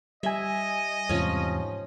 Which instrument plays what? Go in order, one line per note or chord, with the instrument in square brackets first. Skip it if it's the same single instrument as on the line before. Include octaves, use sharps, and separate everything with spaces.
[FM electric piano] G3 G#5 [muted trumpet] D#5 [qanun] E5
[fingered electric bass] E2 G#2 C3 [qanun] F3 C#4